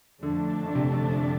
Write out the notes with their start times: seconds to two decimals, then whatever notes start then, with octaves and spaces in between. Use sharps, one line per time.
0.22 F2 D3 F3 A3 D4
0.66 D3
0.75 C3
0.94 D3